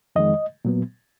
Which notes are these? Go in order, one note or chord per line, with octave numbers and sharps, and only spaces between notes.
F2 D#3 G#3 D#5
A#2 F#3 B3